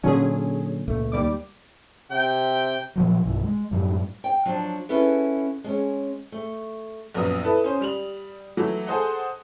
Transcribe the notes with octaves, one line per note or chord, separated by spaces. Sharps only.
A#2 D3 F#3 C#4 G#4
C#2 A#2 A3
D#2 G3 D6
C3 G5
A#2 F3 F#3
B1 G2 E3
G#3
F#2 A2 F#3 G3
G5
F3 F#3 D4 F4
B3 C#4 E4 G#4 A4 B4
G#3 C#4
A3
A#1 F#2 B3 D#6
E4 A4 B4
C#4 C5
G3 F7 F#7
E3 F#3 A3
G#4 A4 C5 D#5 F#5